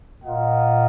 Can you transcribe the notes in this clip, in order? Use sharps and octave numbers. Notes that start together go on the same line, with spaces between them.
A#2 F4 A#4 D#5 F#5